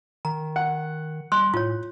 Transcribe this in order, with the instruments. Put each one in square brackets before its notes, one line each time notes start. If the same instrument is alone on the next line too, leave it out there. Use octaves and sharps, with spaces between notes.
[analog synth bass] D#3 [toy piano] A#5
[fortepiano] F#5
[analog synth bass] G3 [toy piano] C6 [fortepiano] F#6
[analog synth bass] A2 [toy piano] F4 C#5